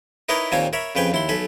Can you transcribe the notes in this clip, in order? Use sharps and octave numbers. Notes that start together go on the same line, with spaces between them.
D#4 E4 A#4 B4 C#5 D#5
D#2 A#2 A#3 C4 C#5 G#5
A#4 C#5 E5 B5
F2 C#3 B4 G5 G#5
D#2 E4 C6
B1 A4 G#5 B5